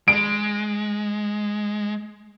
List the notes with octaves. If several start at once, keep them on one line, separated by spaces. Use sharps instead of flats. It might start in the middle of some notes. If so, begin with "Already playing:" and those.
G#3 D7